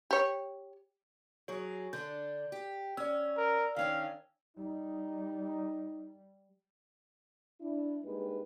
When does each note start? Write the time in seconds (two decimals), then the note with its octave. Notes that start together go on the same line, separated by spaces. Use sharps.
0.11 G4 C#5
1.48 F#3 G#4 C#5
1.93 D3 D4 G6
2.52 G4
2.97 C#4 D5 E6
3.37 A#4
3.76 D#3 C#4 D4 F5
4.57 G3 D#4
7.61 D4 E4
8.05 G2 G#3 A#3 D#4 G4 B4